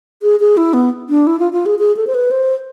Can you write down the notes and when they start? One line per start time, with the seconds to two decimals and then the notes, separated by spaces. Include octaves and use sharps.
0.22 G#4
0.40 G#4
0.57 E4
0.74 B3
1.09 D4
1.27 E4
1.40 F4
1.53 F4
1.66 G#4
1.79 G#4
1.97 A4
2.07 C5
2.14 B4
2.31 C5